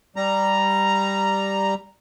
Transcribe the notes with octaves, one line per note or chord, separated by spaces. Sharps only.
G3 A#5